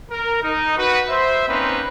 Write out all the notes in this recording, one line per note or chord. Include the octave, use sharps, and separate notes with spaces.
A#4
D#4
F#4 B4
C5 E5
A#3 C4 C#4 D#4 B4